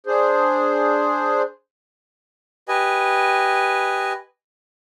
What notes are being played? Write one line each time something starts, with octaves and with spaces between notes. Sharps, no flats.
D4 G#4 C5
G4 B4 D#5 G#5